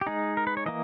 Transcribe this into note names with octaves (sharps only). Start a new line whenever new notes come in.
G4
G#3 D#4 G#4
A#4
B4
C#5
E3 A#3 D#5